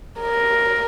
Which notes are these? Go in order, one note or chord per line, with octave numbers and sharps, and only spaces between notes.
A#4